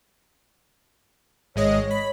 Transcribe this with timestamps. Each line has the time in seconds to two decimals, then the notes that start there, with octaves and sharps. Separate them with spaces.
1.56 G#1 G#3 C#5 D#5
1.91 B5